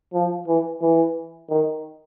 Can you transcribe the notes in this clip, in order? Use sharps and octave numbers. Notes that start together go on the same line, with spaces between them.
F3
E3
E3
D#3